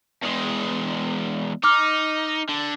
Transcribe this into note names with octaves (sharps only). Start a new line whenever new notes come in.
E2 G#3
D#4 D6 F6
D3